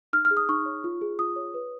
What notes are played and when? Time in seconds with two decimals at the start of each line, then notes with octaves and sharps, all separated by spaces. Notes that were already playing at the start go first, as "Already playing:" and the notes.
0.13 D#4 F6
0.25 F6
0.31 G#4
0.37 D#6
0.49 D#4 C#6
0.66 C#5
0.84 F4
1.01 G#4
1.19 F4 D#6
1.36 C#5
1.54 B4